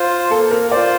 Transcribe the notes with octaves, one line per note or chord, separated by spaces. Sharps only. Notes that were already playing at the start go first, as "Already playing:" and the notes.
Already playing: F4 C5
A#3 A4
A#4
F4 C5 D5